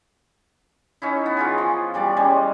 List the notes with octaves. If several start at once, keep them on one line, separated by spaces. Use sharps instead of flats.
C#4 D#4 E4
B3
E3 F4 G#4
F3
E3 G3 D5
G3 G#3 C#4